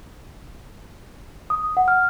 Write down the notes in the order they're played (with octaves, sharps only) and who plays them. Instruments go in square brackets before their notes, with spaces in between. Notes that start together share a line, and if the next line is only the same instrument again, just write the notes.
[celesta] D#6
F#5
F6